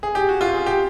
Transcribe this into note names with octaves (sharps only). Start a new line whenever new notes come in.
G#4
G4
F#4
F4
G#4
G4